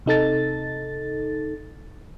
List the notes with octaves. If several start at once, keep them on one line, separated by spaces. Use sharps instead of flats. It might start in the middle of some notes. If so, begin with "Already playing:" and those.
C3 D#4 A4 A6